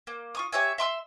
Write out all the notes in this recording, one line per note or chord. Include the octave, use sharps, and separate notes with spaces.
A#3
F4 C#6 D#6
G4 C#5 E5 G#5
E5 C6 D6 E6